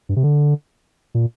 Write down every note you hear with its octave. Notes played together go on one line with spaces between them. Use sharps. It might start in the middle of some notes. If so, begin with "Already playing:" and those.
G2
C3
D3
A#2